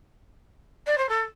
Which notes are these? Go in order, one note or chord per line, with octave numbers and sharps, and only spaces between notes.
D5
C5
A4